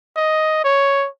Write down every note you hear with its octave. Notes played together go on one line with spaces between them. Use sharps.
D#5
C#5